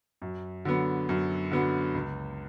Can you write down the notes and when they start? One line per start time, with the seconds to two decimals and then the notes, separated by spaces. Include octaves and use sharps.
0.22 F#2
0.65 D3 F#3 B3
1.09 F#2
1.51 D3 F#3 B3
1.95 C#2